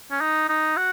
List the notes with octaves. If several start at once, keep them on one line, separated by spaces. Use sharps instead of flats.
C#4
D#4
D#4
F#4